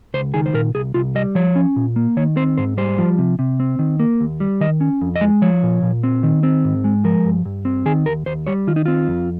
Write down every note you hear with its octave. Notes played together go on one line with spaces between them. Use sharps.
C#2 C5
D#3 G#4
C5
A#2 A#4
C2 G#4
C2 F4
G3 D#5
F3 C#5
C#4
A#2
A#3
D#3 C#5
C4 C5
G#2 C5
G3 C5
F3
C3
C3
C4
D#3
A#3
D#2
G3
D#3 D#5
C#4
F2
D#5
G#3
F3 C#5
A#2
A#2
C4
D#3
C4
G#2
G#3
F3 A#4
G2
G2
C4
D#3 G#4
D#2 A#4
D#2 C5
G3 C#5
D#3 F4
D#4
C4 F4
F2